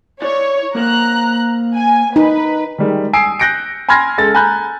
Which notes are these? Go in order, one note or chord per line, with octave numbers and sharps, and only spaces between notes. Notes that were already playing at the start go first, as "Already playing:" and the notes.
E4 C#5 D5
A#3 A#4 C5 A#5 F#6
G#5
D#4 B4
D#3 G3 G#3
G#5 D#6 E6 C7 D7
F#6 G6 A#6 C#7 D7
G#5 B5 C6 F6 G#6 A#6
C#2 G#3 A4 A6
G#5 A#5 B5 F#6 G6